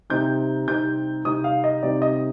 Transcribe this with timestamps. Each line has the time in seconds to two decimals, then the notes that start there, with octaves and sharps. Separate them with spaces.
0.10 C3 G3 C4 D#4 G6
0.67 C3 G3 C4 D#4 G6
1.25 C3 G3 C4 D#4 D#6
1.44 F5
1.64 D#5
1.83 C3 G3 C4 D#4 D5
2.02 D#5